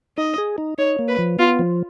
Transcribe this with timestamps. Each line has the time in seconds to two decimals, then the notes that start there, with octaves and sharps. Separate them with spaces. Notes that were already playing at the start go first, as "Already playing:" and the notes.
0.17 D#4 D#5
0.38 G#4
0.58 D#4
0.78 D#4 C#5
0.99 A#3
1.08 B4
1.18 F3
1.39 B3 F4
1.59 F3